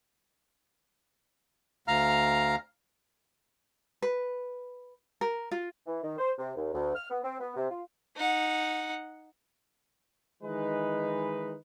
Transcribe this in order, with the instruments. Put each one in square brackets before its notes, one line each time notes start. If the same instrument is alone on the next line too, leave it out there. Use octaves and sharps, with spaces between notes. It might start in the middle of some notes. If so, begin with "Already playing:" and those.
[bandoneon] D2 F5 A#5 F6
[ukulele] B4
A#4
F4
[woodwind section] E3
D#3
C5
C3
D#2
D2
F6
B3
C4
B3
C3
F4
[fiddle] D#4 F#5
[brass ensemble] D#3 E3 G#3 D#4 B4